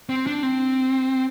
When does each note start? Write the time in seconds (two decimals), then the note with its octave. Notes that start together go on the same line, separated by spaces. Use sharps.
0.09 C4
0.27 D4
0.43 C4